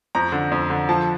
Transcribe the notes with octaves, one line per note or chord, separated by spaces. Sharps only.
F2 A#5
D3
F2
D3
F3 A5